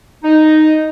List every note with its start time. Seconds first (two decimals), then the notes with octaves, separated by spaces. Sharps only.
0.23 D#4